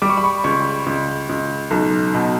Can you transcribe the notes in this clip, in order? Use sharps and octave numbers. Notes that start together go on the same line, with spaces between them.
G3 D6
C#6
B5
C#6
C#2 C#6
C#2
C#2
B1
B2